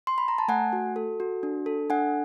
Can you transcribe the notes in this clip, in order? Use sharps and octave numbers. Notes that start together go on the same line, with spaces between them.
C6
B5
A#5
A5
A3 F#5 G#5
F#4
A4
F#4
D4
A4
D4 F#5 G#5